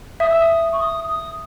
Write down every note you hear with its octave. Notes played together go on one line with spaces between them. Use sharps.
E5 D#6
E6
D#6
C#6
D#6
D#6